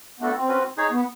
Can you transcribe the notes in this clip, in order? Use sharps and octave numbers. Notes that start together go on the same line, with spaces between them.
A3 B3 D4 F#4 A4
C4
C#4 F#4 B4
D#4 G#4 C#5
B3